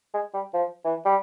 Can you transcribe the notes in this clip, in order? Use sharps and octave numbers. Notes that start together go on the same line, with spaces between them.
G#3
G3
F3
E3
G3